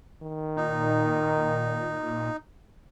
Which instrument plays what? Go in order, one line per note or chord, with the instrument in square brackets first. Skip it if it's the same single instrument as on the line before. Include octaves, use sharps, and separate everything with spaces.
[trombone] D#3
[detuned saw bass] A#2 [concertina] D#4